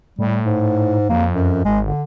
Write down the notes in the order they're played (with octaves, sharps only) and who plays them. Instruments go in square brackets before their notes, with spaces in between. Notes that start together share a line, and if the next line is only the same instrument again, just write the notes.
[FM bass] A2 [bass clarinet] G3
[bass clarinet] G#2
[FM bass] F2 [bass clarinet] A#3
[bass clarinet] F#2
[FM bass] G#1 [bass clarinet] G#3
[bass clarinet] D3